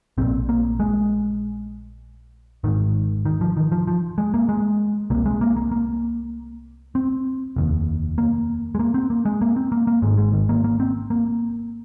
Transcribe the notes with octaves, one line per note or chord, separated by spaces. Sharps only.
A#1 A#2 C4
A#3
G#3
G#1 G#2 D#3
D#3
F3
D#3
F3
F3
G#3
A#3
G#3
C2 C3 A#3
G#3
A#3
A#3
A#3
C4
F1 D#2
A#3
G#3
A#3
C4
A#3
G#3
A#3
C4
A#3
A#3
G#1 G#2 G#3
G#3
D#3
A#3
A#3
C4
A#3